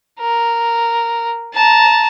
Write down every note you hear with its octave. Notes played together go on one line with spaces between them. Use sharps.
A#4
A5 A#5